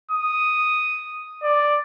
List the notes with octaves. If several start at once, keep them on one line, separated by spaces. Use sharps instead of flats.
D#6
D5